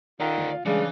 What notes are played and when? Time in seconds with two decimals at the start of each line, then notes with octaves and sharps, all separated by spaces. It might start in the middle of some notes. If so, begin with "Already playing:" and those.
0.20 D#3 F4 D5 F#5
0.38 D2 F5
0.66 C#3 E3 G3 G#3 D4 G4